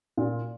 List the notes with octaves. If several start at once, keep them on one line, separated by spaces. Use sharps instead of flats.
A#2